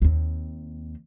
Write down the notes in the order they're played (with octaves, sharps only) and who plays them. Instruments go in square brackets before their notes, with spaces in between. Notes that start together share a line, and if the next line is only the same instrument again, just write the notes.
[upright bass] D#2 C4